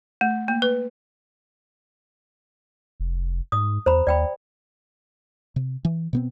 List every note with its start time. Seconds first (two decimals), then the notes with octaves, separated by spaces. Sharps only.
0.21 A3
0.48 A#3
0.62 B4
3.00 F1
3.52 G#2 D#6
3.86 E2 C5 A#5 B5
4.07 D#2 D5 G5 B5
5.56 C3
5.85 E3
6.13 B2 B3 C4